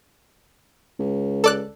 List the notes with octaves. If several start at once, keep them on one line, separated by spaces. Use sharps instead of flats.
C#2
A4 D5 F#6